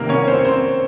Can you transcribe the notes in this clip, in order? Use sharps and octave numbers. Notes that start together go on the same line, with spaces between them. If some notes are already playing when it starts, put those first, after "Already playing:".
Already playing: C2 C3 D#3 G3 A#3 A#4
C#4 C#5
C4 C5
C4 C5